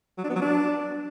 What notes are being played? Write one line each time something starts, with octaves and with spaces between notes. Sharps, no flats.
F#3
D4
B3
F#3
D4